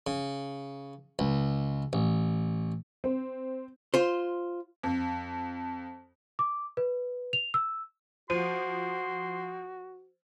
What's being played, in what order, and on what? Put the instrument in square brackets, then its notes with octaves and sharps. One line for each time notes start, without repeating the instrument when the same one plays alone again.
[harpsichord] C#3
C#2
A1
[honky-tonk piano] C4
[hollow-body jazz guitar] F4 C5
[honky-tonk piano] F2
[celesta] D6
B4
F7
E6
[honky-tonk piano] F3 [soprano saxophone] F#4 [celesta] C5 D#7 [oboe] C6